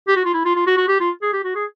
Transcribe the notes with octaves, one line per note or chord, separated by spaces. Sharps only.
G4
F#4
F4
E4
F4
F4
F#4
F#4
G4
F4
G#4
G4
F#4
G#4